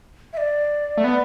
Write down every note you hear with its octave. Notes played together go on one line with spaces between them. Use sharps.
E5
D5
A3
B3